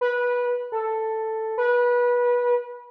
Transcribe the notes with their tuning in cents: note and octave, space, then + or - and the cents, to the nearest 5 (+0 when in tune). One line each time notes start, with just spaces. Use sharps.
B4 -15
A4 +5
B4 -25